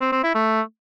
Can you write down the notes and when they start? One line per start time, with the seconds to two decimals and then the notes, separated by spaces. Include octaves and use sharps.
0.01 C4
0.12 C4
0.23 E4
0.35 A3